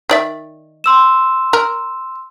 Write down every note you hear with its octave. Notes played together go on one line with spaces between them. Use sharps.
D#3 D5 E5
C6 E6 E7
A#4